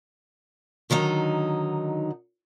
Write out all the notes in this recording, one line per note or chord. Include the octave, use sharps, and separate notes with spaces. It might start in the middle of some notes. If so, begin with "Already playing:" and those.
D3 D#3 F#3 D#4